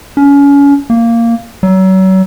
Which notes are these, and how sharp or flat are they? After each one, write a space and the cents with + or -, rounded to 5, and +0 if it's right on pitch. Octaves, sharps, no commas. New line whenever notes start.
C#4 +30
A#3 -10
F#3 +35